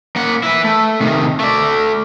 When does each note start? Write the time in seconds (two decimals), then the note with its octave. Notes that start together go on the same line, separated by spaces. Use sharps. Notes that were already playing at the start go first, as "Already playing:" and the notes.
0.16 A#3 F#5
0.43 E4 B4
0.64 A3
1.01 C3 D#3
1.40 A3 D5